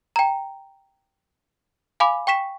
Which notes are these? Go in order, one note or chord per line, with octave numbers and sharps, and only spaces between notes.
G5 A#5
F5 G#5 B5 D6
G5 C#6 B6 E7